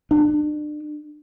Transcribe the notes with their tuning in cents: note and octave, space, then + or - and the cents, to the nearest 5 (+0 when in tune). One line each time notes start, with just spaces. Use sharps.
D4 +35